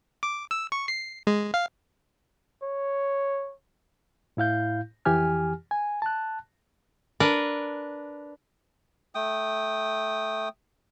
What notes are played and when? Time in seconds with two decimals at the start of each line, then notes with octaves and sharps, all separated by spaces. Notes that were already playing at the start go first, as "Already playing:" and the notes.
0.23 D6
0.51 E6
0.72 C#6
0.88 C7
1.27 G#3
1.54 F5
2.62 C#5
4.37 A2 E4 F5 G6
5.05 F2 E3 G4 G#5 F6
5.71 G#5
6.02 A5 F#6
7.20 D4 A#4 B4
9.15 A3 G5 D#6